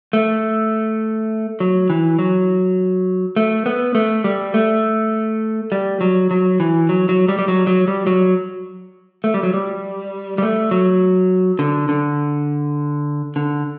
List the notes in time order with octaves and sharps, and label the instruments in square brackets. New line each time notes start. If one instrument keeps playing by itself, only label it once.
[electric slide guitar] A3
F#3
E3
F#3
A3
B3
A3
G3
A3
G3
F#3
F#3
E3
F#3
F#3
G3
G3
F#3
F#3
G3
F#3
A3
G3
F#3
G3
G3
A3
F#3
D3
D3
D3